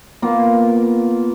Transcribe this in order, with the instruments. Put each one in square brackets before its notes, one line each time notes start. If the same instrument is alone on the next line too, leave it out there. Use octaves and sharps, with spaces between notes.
[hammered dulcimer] A#3 B3 F4